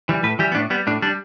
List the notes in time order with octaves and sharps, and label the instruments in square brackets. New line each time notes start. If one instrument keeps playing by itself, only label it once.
[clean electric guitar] E3 G3
A2 B4
E3 G3 G4
B3
A2 D4
G3 B3
A2 D4
G3 D4